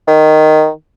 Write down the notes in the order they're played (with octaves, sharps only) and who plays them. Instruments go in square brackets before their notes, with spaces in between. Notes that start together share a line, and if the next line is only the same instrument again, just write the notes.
[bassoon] D#3